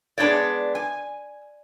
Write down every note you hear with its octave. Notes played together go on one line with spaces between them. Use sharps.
G#3 B3 D4 D#4 C#5 D5
G#5